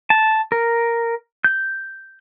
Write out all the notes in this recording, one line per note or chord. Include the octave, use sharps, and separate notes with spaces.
A5
A#4
G6